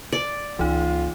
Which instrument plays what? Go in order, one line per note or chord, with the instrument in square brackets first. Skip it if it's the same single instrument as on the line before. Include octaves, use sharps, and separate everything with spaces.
[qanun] D5
[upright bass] C#2 A#3 [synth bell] E3 D#4 [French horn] F4